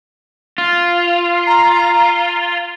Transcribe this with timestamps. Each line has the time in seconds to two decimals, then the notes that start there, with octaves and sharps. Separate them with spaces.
0.58 F4
1.47 A#5